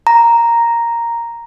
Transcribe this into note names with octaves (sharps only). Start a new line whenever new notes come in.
A#5